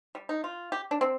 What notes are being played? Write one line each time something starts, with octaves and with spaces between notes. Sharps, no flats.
G3
D#4
F4
G4
D4
C4